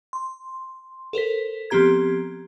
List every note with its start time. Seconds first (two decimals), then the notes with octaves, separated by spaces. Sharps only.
0.13 C6
1.13 A4 A#4 C5 B6
1.70 F3 B3 C4 G4 A#5 G#6